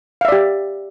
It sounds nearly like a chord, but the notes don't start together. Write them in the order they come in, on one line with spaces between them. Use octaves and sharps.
F5 E5 D5 G4